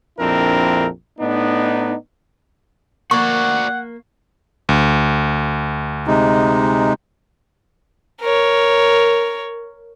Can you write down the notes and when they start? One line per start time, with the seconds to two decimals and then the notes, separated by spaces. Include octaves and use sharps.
0.19 A#1 F2 C4 D4 E4 A#4
1.19 A2 B3 D4 D#4
3.11 A#3 F#4 D5 F#5 C#6
4.69 D2
6.07 C3 G#3 D#4
8.21 A#4 C#5